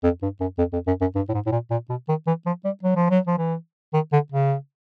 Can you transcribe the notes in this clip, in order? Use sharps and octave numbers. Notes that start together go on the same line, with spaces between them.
F2
G2
F#2
F2
F2
F#2
F#2
G2
A2
G#2
A2
A#2
A#2
B2
D#3
E3
F3
G3
F#3
F3
F#3
F3
E3
D#3
D3
C#3